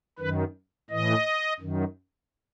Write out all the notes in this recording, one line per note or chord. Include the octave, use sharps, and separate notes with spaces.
F#2 D#3 B4
A2 E3 D#5
F#2 D#3